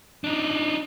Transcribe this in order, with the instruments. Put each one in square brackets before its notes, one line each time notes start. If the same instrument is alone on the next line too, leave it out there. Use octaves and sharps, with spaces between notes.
[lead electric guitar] D4 D#4